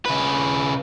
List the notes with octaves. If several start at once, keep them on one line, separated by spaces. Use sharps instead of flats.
C#3 B4